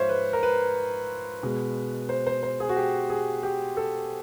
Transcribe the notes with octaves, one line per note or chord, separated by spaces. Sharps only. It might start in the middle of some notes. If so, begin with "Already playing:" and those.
Already playing: G#2 F3 C5 C#5 E5 F5
B4
A#4
B4
B2 G#3
C5
C5
C5
G#4
F#4
G4
G#4
G4
A4